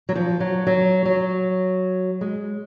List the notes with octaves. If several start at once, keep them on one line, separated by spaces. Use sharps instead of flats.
F#3
F3
F#3
F#3
F#3
G#3